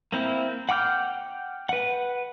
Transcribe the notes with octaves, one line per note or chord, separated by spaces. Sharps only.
A#3 C4 E4
F#5 G5 D6 F6 G6
B4 F#5